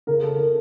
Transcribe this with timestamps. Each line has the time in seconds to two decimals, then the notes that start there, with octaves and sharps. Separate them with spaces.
0.07 C#3 A#4
0.23 A4
0.38 A#4